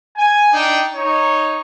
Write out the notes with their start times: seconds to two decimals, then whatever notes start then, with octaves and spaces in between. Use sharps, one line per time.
0.17 G#5
0.53 D4 D#4 G5
0.96 D#4 C#5